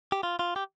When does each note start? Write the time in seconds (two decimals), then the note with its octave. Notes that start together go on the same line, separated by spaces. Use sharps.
0.12 G4
0.23 F4
0.39 F4
0.56 G4